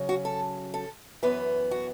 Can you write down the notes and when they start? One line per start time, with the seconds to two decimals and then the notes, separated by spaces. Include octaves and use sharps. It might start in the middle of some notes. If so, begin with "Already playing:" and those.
Already playing: C#3 F#3 C#4
0.09 F#4
0.25 A4
0.74 A4
1.23 F#2 E3 B3 B4
1.71 F#4